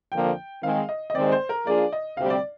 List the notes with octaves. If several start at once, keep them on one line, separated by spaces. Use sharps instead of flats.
F2 D3 F3 A#3 G5
D#3 G#3 C4 F5
D#5
D#5
D#2 D#3 G#3 C4 D5
C5
A#4
F3 A#3 D4 F4 G#4 D5
D#5
D2 C3 G3 C4 G4 F5
D5